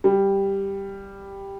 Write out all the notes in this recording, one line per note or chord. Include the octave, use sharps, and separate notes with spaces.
G3